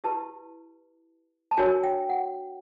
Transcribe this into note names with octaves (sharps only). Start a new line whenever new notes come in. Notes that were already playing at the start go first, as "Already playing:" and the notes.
E4 G4 B4 A5
A5
D4 F#4 A#4 C#5 G#5
G5
F#5